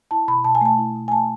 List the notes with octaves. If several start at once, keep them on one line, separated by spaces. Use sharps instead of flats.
E4 A5
B2 B5
B2 A5
G#5
A3 A5
E4
B2
G#5
A3 A5